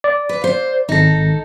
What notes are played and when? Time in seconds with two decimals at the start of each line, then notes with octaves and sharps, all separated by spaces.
0.04 D5
0.29 B4
0.42 C5 F5
0.89 G#1 D#4 A4 A#6